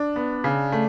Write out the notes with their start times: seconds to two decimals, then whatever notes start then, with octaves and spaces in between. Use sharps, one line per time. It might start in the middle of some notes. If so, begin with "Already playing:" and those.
Already playing: D4
0.16 B3
0.44 C#3
0.72 A3